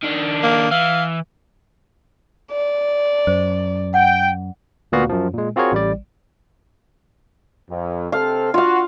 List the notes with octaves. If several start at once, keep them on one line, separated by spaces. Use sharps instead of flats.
D#3 D4
A#3
E3 F5
D5
F#2 C5
F#5 G5
D2 A#2 B3 F#4 F5
F#2 F3
A#2 G#3
C4 F4 F#4 G#4 A#4 C#5
A1 G3 D5
F2
C3 C4 A4 F5
F4 F#4 F5